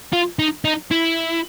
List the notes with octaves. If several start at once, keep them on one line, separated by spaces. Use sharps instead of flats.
F4
D#4
D#4
E4